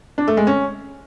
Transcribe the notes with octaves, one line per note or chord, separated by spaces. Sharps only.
D4
A3
G#3
C#4